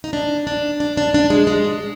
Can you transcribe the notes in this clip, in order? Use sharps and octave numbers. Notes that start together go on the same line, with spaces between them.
D#4
D4
D4
D4
D4
D4
G#3
G#3